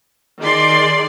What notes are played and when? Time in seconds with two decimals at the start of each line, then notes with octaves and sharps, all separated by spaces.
0.39 D#3 G#4 D5 C6